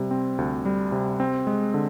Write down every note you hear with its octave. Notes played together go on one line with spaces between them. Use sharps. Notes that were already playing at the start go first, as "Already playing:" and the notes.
Already playing: C3 G3
C4
D2
G3
C3
C4
G#3
D3